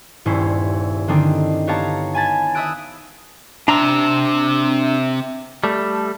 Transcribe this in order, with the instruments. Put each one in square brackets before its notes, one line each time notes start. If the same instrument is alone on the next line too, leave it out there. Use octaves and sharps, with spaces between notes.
[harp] D#1 G2 C#4 E4 C5
D3 D#3 C4 D4 D#4
B3 G4 C#5 F5 A5 A#5
G#5 A5 B5 G#6 A6
E5 B5 D#6 E6 F#6 D7
[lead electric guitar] C3 C4 [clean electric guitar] D4 A#5
[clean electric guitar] G3 A3